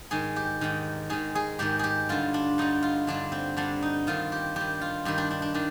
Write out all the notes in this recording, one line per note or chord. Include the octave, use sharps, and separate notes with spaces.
G#2 D#3 G#4
G4
G#2 D#3
G#2 D#3 G#4
G#4
G#2 D#3 G4
G4 G#4
G2 D3 F4
D4
G2 D3 D#4
F4
G2 D3 D4
C4
G2 D3 D4
D#4
G2 D#3 F4
G4
G2 D#3 G4
F4
G2 D#3 G4
D4
D4
D4
D#3 D4